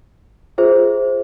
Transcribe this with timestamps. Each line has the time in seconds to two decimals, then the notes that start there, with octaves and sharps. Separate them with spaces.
0.58 F4 G#4 C5 E5